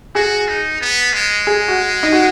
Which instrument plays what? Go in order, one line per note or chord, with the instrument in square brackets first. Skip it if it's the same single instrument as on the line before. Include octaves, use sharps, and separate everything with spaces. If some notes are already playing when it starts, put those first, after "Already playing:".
[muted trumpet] F#4 [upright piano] G#4
[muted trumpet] D#4
B3
G#3
[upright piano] G#4
F#4
D#4
F#4